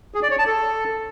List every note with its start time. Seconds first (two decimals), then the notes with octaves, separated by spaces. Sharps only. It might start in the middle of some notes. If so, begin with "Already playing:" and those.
0.14 G#4
0.23 D5
0.31 C#5
0.39 A5
0.47 A4